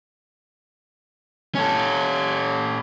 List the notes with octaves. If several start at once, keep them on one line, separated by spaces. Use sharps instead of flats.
C#4 A4